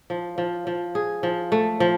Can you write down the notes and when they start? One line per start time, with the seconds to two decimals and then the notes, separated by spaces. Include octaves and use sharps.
0.10 F3
0.38 F3
0.67 F3
0.95 G#4
1.23 F3
1.52 A3
1.80 F3